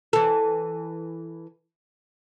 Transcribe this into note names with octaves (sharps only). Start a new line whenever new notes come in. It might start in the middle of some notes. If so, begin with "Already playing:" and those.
E3 A4